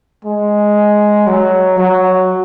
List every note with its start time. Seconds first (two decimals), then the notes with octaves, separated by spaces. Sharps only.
0.25 G#3
1.27 F#3
1.78 F#3